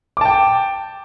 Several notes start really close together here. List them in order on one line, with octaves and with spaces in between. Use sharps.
D6 A5 G5